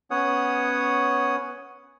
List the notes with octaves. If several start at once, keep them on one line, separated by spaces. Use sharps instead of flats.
B3 C#4 C#5 F#5 D#6